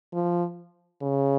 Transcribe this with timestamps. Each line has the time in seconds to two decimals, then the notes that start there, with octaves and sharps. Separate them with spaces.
0.13 F3
1.02 C#3